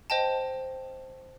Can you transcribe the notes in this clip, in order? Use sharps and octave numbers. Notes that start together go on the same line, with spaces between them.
C5 D#5 G5 A5